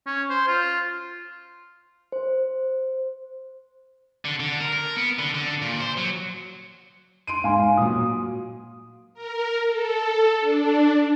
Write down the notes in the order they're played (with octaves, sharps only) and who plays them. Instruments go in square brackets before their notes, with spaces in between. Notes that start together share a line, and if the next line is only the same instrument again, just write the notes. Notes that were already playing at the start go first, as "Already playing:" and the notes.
[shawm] C#4
C5
F4
[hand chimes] C5
[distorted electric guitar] D3
D3
A#4
A#4
B3
D3
D3
A#2
C5
F#3
[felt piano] C6 D7 D#7
[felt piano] G#2 [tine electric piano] F5 G#5 C6
[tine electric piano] F5
[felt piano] A#2 F#3 [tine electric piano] D#6
[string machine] A#4
A4
D4